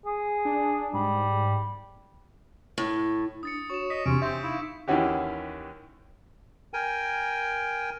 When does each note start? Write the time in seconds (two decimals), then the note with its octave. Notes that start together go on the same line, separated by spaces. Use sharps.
0.05 G#4
0.45 D4
0.94 G#2 G3
2.78 A2
3.43 D4 D#6 A6 C#7
3.70 F#4 C#5 C#6 E7
3.90 D#5 B6
4.06 E2 C3 C#4 D4 G4 C6 D7
4.22 C4 E5 G6 A#6
4.43 D#4 E4 F5 E6
4.88 D#2 D#3 E3 C#4 F#4 G4
6.73 A#4 G5 G#5